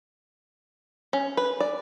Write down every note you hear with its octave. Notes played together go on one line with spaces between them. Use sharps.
C#4
B4
D5